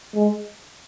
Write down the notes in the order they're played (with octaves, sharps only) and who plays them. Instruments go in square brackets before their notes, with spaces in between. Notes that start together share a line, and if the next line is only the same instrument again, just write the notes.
[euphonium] G#3